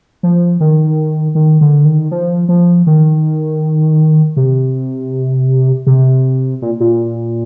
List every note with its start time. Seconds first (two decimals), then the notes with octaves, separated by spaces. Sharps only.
0.23 F3
0.60 D#3
1.35 D#3
1.61 D3
1.85 D#3
2.11 F3
2.49 F3
2.87 D#3
4.37 C3
5.87 C3
6.62 A#2
6.80 A#2